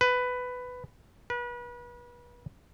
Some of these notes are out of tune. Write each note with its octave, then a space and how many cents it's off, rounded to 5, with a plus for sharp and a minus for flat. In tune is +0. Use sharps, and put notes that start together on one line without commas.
B4 +10
B4 -35